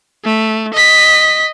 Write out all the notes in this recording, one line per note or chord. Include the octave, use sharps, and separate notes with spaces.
A3
D#5 B6